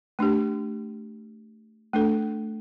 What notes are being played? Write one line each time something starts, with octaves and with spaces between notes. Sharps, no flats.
A3 D4 G4
A3 D4 A4